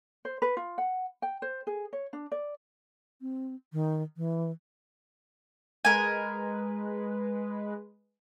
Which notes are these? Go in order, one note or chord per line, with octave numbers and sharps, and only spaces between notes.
C5
B4
F4
F#5
G5
C5
G#4
C#5
D4
D5
C4
D#3
E3
G#3 A#4 B4 G#5